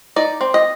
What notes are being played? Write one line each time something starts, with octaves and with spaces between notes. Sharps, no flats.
D#4 D5
C4
D#5